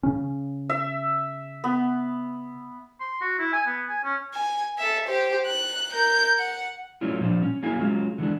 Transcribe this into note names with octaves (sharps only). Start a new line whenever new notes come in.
C#3 C#4
E5
B3
C6
F#4
E4
G#5
B3
G#5
C#4
G#5
A4 E5
G4 C5
F#6
A#4 G6
F#5
F#3 G3 A3 C#4 E4 F4
A#2 F3 G3 D4
C#4
F#3 A#3 E4 G#4 F5 G#5
F#3 G#3 C#4 F4
D3 E3 G#3 D4